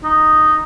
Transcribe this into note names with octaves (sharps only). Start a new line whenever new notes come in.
D#4